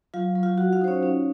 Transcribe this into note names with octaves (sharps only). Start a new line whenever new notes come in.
F#3 F4 F5
F#3
F4 F5
F#4 F#5
F4 F5
D#4 C5
C#4 C#5
C#4